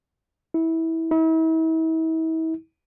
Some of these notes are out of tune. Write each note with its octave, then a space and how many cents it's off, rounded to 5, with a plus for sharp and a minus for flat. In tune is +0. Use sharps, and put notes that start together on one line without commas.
E4 -20
E4 -40